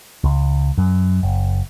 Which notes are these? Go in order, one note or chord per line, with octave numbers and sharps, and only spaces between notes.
C#2
F#2
F#1